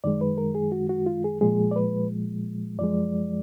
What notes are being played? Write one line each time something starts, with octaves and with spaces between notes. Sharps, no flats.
F#2 D#3 G#3 D5
B4
A#4
G#4
F#4
F#4
F4
G#4
A#2 F3 G#3 G#4
D5
B4
F#2 F3 G#3 D5